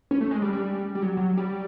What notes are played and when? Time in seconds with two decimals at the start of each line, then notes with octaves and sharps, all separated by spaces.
0.11 C#4
0.21 A3
0.31 G#3
0.42 G3
0.53 G3
0.95 G3
1.02 F#3
1.17 F#3
1.37 G3